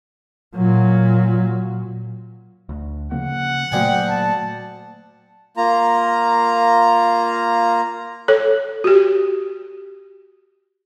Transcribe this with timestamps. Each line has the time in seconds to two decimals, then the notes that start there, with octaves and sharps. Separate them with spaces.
0.56 A#2 F#3
2.69 D2
3.12 C#3 F3 A#3 F#5
3.72 D2 A#2 D3 F#3 A#3 G5 G#5
4.09 A5
5.57 A#3 F4 A#5
8.28 A4 C#5
8.84 F#4 G4